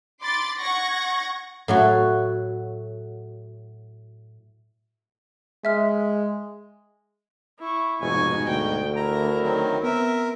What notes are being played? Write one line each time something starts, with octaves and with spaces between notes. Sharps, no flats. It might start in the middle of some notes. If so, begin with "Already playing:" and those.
B5 C6 D6 A6
F#5 C#6 G#6 A#6
A2 F#3 F#4
G#3 E5 F6
E4 C#6
F1 G#2 B2 G#5 C#6
D2 G5
E4 A#4 A#5
D#3 F#3 C4
B3 C4 A#4 E5